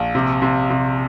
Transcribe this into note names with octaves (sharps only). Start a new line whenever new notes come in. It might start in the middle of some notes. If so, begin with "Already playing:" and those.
Already playing: A#1
C3
C3
C3